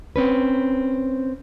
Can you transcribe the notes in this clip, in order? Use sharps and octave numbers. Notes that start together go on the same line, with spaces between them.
C4 C#4 B4